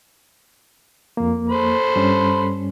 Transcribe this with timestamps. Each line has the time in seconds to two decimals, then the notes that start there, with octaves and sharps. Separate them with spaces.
1.17 F2 A#3
1.50 A4 C5 B5
1.96 G2 G3 C#4